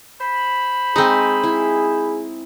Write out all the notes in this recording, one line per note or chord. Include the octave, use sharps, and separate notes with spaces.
C5 B5
G#3 C4 D#4 G#4
E4